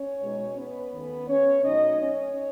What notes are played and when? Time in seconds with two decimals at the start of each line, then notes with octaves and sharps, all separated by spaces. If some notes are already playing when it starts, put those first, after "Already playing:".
Already playing: C#4 C#5
0.23 B2 G#3 D#4
0.58 B3 B4
0.93 D#2 D#3 A3 C#4
1.27 C#4 C#5
1.63 B2 F#3 A3 D#4 D#5
1.99 C#4 C#5